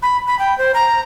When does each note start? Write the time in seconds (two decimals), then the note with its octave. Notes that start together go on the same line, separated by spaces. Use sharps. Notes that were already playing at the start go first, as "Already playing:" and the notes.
0.03 B5
0.27 B5
0.39 G5
0.58 C5
0.75 A#5